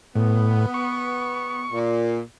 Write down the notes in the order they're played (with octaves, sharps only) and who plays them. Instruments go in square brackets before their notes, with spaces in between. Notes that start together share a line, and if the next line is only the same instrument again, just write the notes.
[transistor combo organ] A2 [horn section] B3
[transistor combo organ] C#6
[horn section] A#2